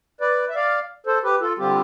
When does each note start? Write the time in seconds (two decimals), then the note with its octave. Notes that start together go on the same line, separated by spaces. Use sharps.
0.21 B4 D5
0.49 E5
0.55 D5 F5
1.06 A4 C5
1.23 G4 B4
1.41 F4 A4
1.58 D3 G3 C4 F4 G4